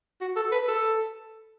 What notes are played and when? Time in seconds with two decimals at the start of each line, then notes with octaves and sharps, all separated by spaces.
0.21 F#4
0.36 A4
0.52 B4
0.68 A4